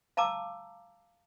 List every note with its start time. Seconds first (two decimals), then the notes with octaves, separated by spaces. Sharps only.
0.17 F5 A5 A#5 D6 E6